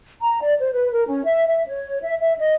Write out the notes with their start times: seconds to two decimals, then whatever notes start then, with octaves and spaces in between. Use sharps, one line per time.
0.22 A#5
0.42 D5
0.60 C5
0.72 B4
0.92 A#4
1.07 C#4
1.24 E5
1.47 E5
1.67 C#5
2.02 E5
2.21 E5
2.38 D#5